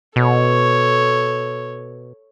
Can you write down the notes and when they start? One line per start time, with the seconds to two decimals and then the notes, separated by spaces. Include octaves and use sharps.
0.16 B2 A4 C#5